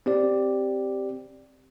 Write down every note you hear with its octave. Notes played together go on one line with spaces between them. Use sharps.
C4 G4 D5